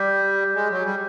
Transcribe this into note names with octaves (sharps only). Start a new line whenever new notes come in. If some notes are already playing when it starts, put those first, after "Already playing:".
Already playing: G3 D6 G6 B6
G#3
F#3
G3